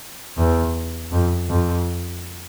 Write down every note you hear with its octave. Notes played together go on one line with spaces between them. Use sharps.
E2
F2
F2